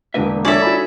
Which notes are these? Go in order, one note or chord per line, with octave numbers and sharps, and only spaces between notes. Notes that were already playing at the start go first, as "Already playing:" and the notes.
E1 D3 A#3 A#4 B4 E5
D4 F4 G4 A4 C#5 D5 E5 G#5
D#4 F#4 B5